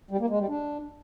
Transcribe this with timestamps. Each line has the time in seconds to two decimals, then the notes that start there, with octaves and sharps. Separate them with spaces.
0.11 G3
0.20 A#3
0.30 G#3
0.39 G3
0.48 D4